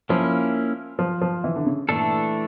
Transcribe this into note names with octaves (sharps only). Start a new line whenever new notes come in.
F3 A#3 C#4 E4
F3
F3
E3
D3
C#3
A#2 E3 A3 D4 A4